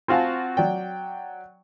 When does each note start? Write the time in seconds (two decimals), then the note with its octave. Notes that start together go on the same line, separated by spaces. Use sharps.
0.08 C4 F4 F#4 F5 G#5 A5
0.57 F#3 D5 G5